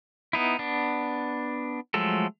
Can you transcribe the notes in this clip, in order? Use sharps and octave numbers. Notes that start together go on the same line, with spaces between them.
B3 D#4 E4
B3 D4
F3 F#3 G#3 A3 A4